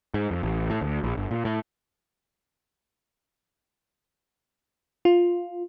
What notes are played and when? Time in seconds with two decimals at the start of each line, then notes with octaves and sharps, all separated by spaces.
0.14 G#2
0.31 F2
0.43 A1
0.70 A2
0.81 D2
1.04 A#1
1.17 G1
1.31 A#2
1.45 A2
5.05 F4